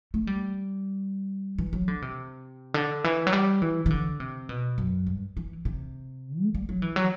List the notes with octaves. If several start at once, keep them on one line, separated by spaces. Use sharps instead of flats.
A3
G3
E3
F#3
D3
C3
D3
E3
F#3
G3
E3
E3
D3
C3
B2
F#2
G2
E3
C3
A3
G3
F#3
E3
F#3